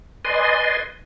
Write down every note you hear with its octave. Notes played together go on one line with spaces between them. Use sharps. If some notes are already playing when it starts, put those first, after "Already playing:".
B4 D5 D#5 G#5 C6